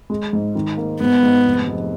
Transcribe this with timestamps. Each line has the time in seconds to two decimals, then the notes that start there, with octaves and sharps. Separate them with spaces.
0.10 G#3
0.33 G#2
0.55 D#3
0.77 A#3
1.00 G#2 B3
1.23 G#2
1.45 F1
1.68 F1